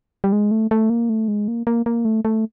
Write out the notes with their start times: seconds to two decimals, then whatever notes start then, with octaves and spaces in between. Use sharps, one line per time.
0.24 G3
0.32 G#3
0.51 A3
0.71 A3
0.90 A#3
1.09 A3
1.28 G#3
1.48 A#3
1.67 A#3
1.86 A#3
2.05 A3
2.25 A3